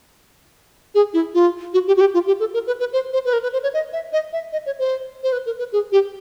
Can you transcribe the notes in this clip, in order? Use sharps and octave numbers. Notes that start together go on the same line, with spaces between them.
G#4
E4
F4
F#4
G4
F#4
G4
F4
G4
A4
A#4
B4
B4
C5
C5
B4
A#4
B4
C5
C#5
D#5
E5
D#5
E5
D#5
C#5
C5
C5
B4
A#4
B4
G#4
G4